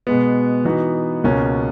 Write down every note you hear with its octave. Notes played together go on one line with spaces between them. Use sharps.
B2 G#3 B3
E3 B3 D#4 F#4
C#2 B2 A#3 C#4